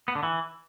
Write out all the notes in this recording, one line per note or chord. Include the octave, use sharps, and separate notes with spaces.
B3
D3
E3